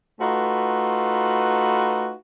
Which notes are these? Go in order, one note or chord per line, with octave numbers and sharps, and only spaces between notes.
A3 D#4 F4 F#4 B4